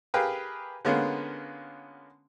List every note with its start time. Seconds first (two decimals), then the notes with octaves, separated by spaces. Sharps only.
0.14 G4 G#4 A#4 B4 F5 G5
0.85 D3 G#3 A#3 B3 C#4 F4